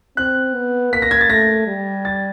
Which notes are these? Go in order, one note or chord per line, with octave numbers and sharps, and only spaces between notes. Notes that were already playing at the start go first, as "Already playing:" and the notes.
C4 F#6
B3
A#3 B6
A#6
G#6
A6
A3 A#6
G3
A6